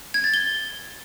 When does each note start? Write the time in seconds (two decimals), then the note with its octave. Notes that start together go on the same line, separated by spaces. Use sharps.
0.14 G#6
0.24 A6
0.34 G7